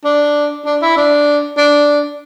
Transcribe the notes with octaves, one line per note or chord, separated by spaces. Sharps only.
D4
D4
E4
D4
D4